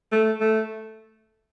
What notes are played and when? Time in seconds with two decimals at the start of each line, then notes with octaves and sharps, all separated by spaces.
0.12 A3
0.41 A3